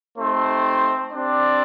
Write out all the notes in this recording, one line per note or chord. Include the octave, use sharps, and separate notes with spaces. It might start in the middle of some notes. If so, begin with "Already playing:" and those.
A3 C4 D#4 G4 C5
C4 D4 G4 D5